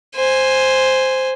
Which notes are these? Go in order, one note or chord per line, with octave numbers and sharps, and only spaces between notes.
C5 G#5